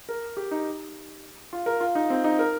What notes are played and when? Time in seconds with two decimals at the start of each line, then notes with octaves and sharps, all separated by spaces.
0.09 A#4
0.37 G4
0.51 D#4
1.53 F4
1.66 A#4
1.80 F4
1.95 D#4
2.10 C4
2.24 D#4
2.39 A#4